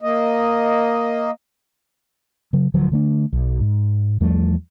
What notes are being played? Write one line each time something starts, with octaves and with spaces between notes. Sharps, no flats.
A#3 D#5
C#3 F#3
D1 D3 F3 F#3
D3 A3 D4
B1
G#2
E2 F3 G3 A3